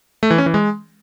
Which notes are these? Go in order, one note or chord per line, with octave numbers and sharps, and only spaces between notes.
A3
E3
C#4
E3
G#3